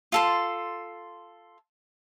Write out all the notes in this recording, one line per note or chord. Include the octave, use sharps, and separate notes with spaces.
F4 A4 C6